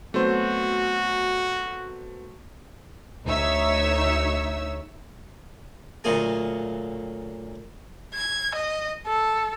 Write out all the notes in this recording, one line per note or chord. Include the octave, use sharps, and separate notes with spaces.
F#3 A3 B3 C4 F#4 C5
D2 D#4 C#5 E5 E6
D2 A#2 F#3 F4 G#4 G#5
G#6
D#5
A4